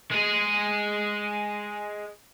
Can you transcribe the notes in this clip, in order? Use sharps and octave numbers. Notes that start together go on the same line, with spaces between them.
G#3 G#4